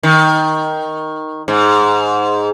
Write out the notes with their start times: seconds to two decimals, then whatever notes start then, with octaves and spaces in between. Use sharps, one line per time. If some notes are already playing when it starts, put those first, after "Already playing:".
0.03 D#3
1.48 G#2